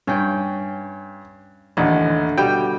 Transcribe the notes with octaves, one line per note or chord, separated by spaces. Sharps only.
G2 C#4 G5
A1 D#2 D3
B2 G3 G4 G5